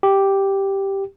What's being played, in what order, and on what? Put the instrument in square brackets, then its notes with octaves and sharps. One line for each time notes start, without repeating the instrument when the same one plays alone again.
[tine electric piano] G4